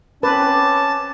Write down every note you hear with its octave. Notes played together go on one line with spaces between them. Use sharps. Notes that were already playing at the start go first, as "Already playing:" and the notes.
C4 C#4 B4 A5 D6